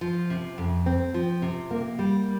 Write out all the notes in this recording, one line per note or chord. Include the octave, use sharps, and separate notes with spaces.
F3
C3
F2
C4
F3
C3
A#3
G3